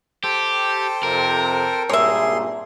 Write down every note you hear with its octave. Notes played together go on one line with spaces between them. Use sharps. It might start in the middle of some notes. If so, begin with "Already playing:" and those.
G4 A4 C5 G5
F2 C3 A#4
G#1 G2 A#2 G#4 C#5 E5 C6